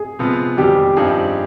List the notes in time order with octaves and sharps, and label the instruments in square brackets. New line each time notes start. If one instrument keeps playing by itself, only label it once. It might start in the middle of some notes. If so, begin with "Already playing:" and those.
Already playing: [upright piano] G#4
[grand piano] C3 F3 G#3 B3 F4
[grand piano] F2 D#3 G3 [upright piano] G4
[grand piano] G2 F3 C4 D#4 G#4